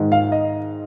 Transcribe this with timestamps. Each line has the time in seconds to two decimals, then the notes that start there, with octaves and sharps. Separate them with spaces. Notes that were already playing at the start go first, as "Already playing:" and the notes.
Already playing: G#2 D#3 G#3
0.12 F5
0.32 D#5